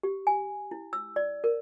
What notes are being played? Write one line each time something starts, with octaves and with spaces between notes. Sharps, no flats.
G4
G#5
E4
E6
D5
A#4